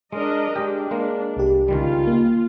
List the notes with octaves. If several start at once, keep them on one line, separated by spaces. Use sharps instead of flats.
G#3 D4 A#4 D#5
G#3 D4 G4
G#3 A#3 A#4
C2 G4
C#2 D#3 G3 F4
A#3